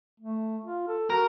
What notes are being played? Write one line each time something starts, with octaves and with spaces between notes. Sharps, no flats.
A3
F4
A4
F#4 A#4